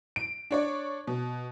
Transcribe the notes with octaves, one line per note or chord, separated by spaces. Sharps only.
D7
D4 C#5 D5
B2